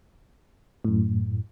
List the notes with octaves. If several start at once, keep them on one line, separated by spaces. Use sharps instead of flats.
F#2 A2